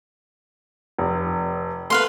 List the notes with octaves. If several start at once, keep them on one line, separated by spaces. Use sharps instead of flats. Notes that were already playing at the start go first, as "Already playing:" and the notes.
F1
A3 B4 F5 C6